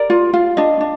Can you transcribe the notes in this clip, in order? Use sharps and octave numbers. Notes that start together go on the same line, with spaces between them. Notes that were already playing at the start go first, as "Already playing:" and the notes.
Already playing: A#4 D5
F4
F4
D4 D#5
D4